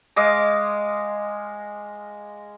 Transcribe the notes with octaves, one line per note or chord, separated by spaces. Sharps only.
G#3 D#5 F5 D6